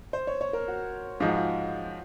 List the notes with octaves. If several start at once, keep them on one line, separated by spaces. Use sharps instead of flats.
C5
C#5
C#5
A#4
F#4
G#2 F3 G#3 F4
F#4
F4